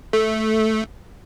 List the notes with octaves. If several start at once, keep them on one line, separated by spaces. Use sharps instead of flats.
A3